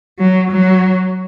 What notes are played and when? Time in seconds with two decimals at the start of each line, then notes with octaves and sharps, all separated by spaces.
0.19 F#3
0.50 F#3